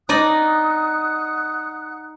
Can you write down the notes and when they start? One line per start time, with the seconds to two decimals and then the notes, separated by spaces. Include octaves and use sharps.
0.09 D#4 D5 D#5 F#5 D#6 F#6